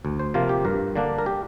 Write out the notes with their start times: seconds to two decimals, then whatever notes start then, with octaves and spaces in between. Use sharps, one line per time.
0.05 D2
0.19 C5
0.34 C3 F3 A#3 F4
0.49 G4
0.65 G2 A#4
0.95 D3 A#3 D4
1.18 A#4
1.26 G4